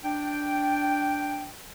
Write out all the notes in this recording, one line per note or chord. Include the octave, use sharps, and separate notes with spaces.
D4 G5